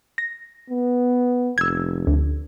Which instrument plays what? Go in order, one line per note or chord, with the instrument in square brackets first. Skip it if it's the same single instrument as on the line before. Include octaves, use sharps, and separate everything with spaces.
[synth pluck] A#6
[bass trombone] B3
[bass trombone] F1 [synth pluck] E6 G#6
[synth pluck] D2